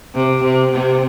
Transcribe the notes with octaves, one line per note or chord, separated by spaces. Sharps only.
C3
C3
C3